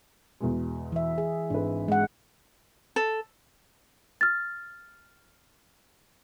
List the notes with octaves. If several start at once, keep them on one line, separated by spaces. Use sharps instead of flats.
E2 B2 G#3
E3 E5
G#4
G#1 D4 B4
G#3 F#5
A4
F6 A6